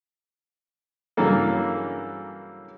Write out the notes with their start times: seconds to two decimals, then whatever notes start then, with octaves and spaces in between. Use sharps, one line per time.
1.17 G2 C#3 E3 F#3 A#3 A4